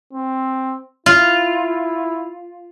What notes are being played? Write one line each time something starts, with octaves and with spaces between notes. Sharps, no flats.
C4
E4 F4